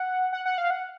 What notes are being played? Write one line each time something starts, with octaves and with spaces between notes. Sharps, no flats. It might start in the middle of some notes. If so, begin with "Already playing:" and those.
Already playing: F#5
F#5
F#5
F5
F#5